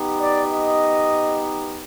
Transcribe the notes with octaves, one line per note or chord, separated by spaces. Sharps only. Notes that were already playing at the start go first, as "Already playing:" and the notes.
Already playing: B3 D#4 G4
D5
D#5